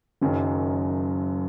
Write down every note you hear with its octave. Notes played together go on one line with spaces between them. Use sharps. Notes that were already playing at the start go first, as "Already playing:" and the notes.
F#1 F#2 D#3